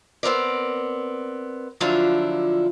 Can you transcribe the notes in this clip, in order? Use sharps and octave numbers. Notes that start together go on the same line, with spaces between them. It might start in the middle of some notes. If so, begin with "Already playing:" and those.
B3 C4 A#4 D5
D3 F3 F#3 D4 E4 F4